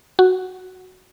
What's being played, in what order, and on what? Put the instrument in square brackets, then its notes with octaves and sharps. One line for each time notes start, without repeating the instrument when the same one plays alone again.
[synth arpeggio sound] F#4